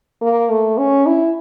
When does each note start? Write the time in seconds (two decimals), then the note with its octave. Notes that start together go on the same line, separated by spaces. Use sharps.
0.22 A#3
0.50 A3
0.78 C#4
1.06 E4